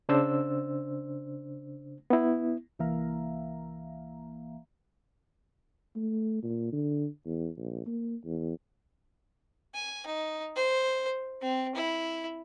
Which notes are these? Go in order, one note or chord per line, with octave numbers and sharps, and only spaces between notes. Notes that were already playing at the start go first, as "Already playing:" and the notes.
C#3 D4 C5 E6
B3 E4
C2 E3 A#3 E5 F5 A#5
A3
A#2
D3
E2
A#1
A#3
E2
G#5
D#4
C5
C4
E4